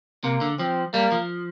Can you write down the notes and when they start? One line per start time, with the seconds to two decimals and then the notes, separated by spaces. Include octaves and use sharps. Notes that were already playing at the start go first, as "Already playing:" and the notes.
0.24 C3 A#3
0.41 D3
0.59 F3 C4
0.93 G3 A#3
1.12 F3